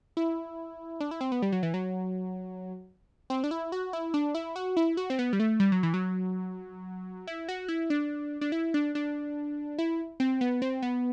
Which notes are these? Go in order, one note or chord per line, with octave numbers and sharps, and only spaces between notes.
E4
D4
E4
C4
B3
G3
F#3
E3
F#3
C4
D4
E4
F#4
E4
D4
E4
F#4
E4
F#4
C4
B3
G3
A3
G3
F#3
E3
F#3
E4
F#4
E4
D4
D4
E4
D4
D4
E4
C4
B3
C4
B3